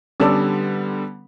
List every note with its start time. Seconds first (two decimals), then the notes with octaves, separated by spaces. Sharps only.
0.20 D3 G3 B3 C#4 A4 D5